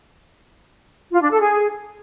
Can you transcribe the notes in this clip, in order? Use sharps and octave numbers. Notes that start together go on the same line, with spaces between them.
F4
D4
A4
G#4